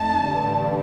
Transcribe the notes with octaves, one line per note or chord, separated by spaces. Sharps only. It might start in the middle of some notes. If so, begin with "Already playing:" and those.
Already playing: F2 A3 D#4 A5
A1 G2 D3